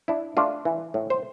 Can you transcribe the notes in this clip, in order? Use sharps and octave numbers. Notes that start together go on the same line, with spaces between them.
D4 E4
A3 D4 F4
E3
A2
C5